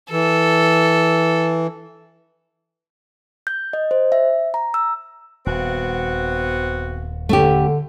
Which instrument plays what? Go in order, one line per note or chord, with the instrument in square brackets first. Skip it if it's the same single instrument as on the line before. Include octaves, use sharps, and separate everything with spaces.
[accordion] E3 [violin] A4
[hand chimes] G6
D#5
C5
E5
A#5
E6
[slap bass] D#1 [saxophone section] B3 C4 F#4
[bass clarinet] D3 [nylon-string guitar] A3 C#4 G4